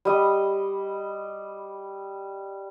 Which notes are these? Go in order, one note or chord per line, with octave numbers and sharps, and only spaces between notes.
G3 D#5